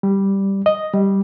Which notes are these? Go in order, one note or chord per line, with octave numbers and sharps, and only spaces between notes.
G3
D#5
G3